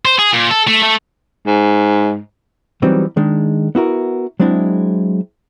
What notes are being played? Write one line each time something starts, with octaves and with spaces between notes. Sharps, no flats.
C5
G#4
A#2
A4
A3
A3
G#2
E3 F#3 G3 B3 C4 D#4
D#3 G#3 D4
B3 E4 F#4 A#4
F#3 G#3 C4 D4 E4